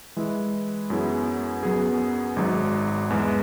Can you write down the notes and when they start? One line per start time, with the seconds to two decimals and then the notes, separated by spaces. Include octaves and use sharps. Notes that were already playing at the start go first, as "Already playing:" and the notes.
0.17 E3 G#3 E4
0.90 F#2 F#3 B3 E4 G#4
1.63 F#2 F#3 B3 G#4
2.36 G#1 G#2 F#3
3.10 E2 E3 G#3